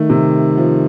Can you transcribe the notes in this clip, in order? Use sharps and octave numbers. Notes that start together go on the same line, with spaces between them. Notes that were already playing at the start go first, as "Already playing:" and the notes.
Already playing: D#3 A3
C3
F3